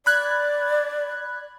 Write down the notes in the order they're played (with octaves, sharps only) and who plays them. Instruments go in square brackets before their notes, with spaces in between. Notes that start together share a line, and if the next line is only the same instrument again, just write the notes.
[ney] D5 [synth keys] B5 F#6 G#6